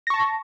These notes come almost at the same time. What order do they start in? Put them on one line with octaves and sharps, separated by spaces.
A#6 C#6 A5